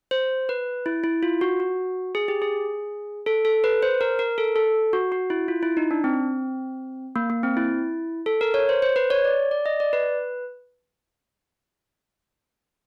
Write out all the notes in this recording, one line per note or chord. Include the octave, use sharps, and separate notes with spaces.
C5
B4
E4
E4
F4
F#4
F#4
G#4
G4
G#4
A4
A4
B4
C5
A#4
A#4
A4
A4
F#4
F#4
E4
F4
E4
D#4
D4
C4
A#3
A#3
C4
E4
A4
A#4
C#5
C5
C5
B4
C#5
D5
D5
D#5
D5
B4